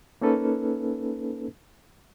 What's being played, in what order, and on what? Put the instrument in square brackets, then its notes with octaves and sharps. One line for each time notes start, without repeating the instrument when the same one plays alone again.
[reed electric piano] A#3 C#4 D#4 A4 B4